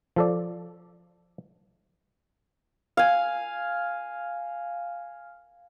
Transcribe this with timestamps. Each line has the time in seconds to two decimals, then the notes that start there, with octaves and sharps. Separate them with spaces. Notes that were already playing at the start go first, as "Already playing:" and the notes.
0.16 F3 A4 D5
2.97 F5 G#5